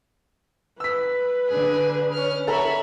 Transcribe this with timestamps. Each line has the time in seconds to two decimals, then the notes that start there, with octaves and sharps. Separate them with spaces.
0.80 B4 E6 B6
1.48 D3 G#4
2.14 C#4 F6
2.47 A4 C#5 E5 A#5 B5